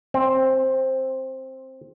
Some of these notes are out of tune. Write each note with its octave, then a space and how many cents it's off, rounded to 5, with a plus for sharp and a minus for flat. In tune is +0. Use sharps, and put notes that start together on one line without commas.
C4 +10